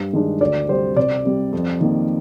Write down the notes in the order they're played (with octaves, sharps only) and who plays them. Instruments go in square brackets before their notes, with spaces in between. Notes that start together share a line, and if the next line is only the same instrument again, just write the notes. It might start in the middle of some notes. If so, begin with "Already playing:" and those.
Already playing: [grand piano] G2
D#3 G#3 D4
D2 D5
C3 G3 C4 C5
C2 D5
C3 G3
F2
D#3 A#3